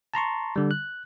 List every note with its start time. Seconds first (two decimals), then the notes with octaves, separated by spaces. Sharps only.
0.14 A5 A#5 C6 C#6
0.56 D3 G3
0.71 F#6